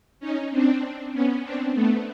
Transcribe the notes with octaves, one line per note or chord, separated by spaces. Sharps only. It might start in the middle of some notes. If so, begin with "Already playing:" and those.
C#4 D#4
C4 D4
B3 C#4
C4 D4
A3 B3